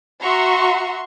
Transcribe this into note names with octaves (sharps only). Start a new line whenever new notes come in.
F#4 E5 A#5 C6 C#6